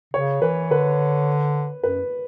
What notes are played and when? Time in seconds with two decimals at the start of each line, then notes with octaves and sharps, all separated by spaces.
0.13 C#3 C#5
0.42 E3 B4
0.71 D3 B4
1.84 F#2 B4